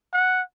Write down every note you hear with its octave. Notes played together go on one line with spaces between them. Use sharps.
F#5